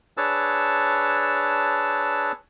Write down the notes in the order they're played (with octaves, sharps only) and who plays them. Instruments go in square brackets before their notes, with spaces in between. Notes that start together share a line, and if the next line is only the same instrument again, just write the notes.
[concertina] D4 G#4 B4 C#5 A5 E6